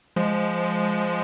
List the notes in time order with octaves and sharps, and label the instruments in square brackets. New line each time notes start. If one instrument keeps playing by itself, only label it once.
[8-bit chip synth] F3 G#3